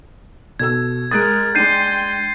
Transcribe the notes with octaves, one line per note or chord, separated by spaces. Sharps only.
B2 A4 E6 G#6
G#3 A#4 D#6 F#6 A6 D7
G#3 D4 G5 C6 G6 C7 D#7